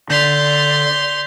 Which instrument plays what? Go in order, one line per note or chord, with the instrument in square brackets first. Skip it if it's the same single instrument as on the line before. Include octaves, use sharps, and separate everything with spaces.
[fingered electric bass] D3 [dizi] D5 [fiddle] C6 [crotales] G6 B6 F7